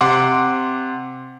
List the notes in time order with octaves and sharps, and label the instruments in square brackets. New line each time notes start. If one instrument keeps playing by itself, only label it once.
[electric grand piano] C3 F#5 C6 D6